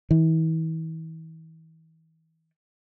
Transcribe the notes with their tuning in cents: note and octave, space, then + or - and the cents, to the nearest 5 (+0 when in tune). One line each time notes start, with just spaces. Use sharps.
E3 -40